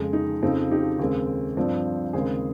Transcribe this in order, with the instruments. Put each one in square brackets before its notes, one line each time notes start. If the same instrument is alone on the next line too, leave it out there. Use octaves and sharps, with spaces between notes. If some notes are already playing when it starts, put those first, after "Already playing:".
Already playing: [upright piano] F2 C#3 G#3
D#4
F2 C#3 F3 C4 D#4
D#4 G4
D#2 C#3 G#3 C4
G2 F3 C4
D#2 C#3 G#3 C4 G#4 C5